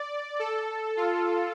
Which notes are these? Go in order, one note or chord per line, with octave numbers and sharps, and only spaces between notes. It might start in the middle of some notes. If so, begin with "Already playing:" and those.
Already playing: D5
A4
F4